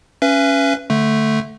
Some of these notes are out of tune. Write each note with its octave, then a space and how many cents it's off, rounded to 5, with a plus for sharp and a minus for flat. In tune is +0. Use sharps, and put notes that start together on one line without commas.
C#4 +0 B4 +0 E5 +45
D3 +0 A3 +0